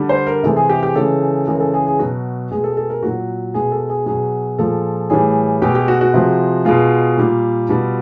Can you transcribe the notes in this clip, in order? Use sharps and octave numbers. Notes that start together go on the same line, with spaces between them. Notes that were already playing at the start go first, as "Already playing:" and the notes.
Already playing: D3 G3
C5
A#4
C3 E3 G#3 A4
G#4
G4
G4
C#3 E3 G#3 A4
C#3 E3 G#3 A#4
A4
G#4
G#4
B2 F#3 F#4
B2 G#3 G#4
A4
A4
A#4
A#2 F#3 F#4
B2 G#3 G#4
A4
G#4
B2 F#3 G#4
A#2 F3 G#3 A4
A2 E3 G3 G#4
B2 G#3 G4
G4
F#4
F#4
C3 F3 G#3
B2 G#3 F4
A#2 G3
B2 G3